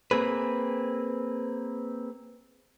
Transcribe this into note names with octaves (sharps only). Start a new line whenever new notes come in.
A#3 C4 G#4 B4